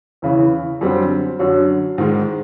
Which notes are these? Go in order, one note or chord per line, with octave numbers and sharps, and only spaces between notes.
E2 C#3 E3
F#2 D3 G3 C4
F#2 D3 F#3
G#2 D#3 G#3